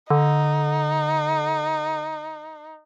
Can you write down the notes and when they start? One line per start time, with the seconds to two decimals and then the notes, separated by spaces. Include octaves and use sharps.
0.10 D3 D#4